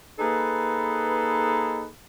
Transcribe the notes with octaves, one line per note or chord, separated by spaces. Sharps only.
A#3 D#4 G#4 A4 B4